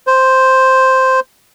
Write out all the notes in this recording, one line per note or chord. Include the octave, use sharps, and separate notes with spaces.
C5